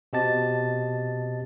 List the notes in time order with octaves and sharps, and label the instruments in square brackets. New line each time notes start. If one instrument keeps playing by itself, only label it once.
[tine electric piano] B2 C4 G4 D#5 A5 A6